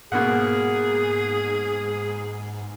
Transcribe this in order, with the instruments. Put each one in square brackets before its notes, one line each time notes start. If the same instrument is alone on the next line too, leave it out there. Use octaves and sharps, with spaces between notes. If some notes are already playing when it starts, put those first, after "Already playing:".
[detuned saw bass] G#2 [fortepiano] B2 A#3 F#5 [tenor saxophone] G#4